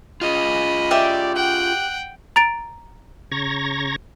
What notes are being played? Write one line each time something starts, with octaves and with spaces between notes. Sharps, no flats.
F4 G#4 D#5 B5
G4 D5 E5
F#5 G5 F#6
A#5 A6 D7
C#3 A#5 C#6 G#6 A#6